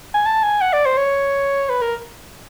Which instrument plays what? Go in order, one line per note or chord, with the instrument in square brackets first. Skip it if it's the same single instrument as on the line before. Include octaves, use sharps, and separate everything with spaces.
[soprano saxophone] G#5
A5
G#5
F#5
D5
C5
C#5
B4
A#4